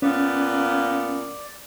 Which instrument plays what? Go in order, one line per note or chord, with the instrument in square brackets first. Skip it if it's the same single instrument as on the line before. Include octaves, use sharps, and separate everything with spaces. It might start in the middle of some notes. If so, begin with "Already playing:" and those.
[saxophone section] A#2 A#3 B3 [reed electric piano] C#4 [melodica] D5